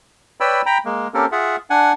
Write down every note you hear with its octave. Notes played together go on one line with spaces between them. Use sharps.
B4 C#5 D5 G5 B5 E6
G5 A#5 B5
G#3 A#3
A#3 C4 C#4 G4 A4 A#4
F4 G#4 E5 F#5
D4 F#5 G#5